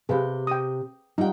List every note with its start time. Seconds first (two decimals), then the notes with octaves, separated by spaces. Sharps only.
0.09 C3 G4 G#4 B4 F5
0.47 G5 D#6
1.18 G3 D#4 F4 F#5 G5